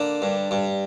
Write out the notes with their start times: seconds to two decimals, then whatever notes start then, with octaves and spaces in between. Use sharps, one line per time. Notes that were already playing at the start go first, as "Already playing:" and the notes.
Already playing: D3 A#3 D5
0.22 G2
0.51 G2